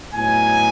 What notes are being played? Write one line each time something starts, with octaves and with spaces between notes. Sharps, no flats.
A2 F#3 B3 D#4 G#5